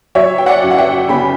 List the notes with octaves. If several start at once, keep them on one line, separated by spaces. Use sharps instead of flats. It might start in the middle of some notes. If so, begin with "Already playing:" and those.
F#3 C#5 E5
G5
D5 F#5
F#2
F#5
E5 G5
C#3 G5 B5